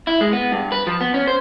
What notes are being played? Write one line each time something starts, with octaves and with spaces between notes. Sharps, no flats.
E4
G#3
B3
G2
B4
F3
B3
C#4
C5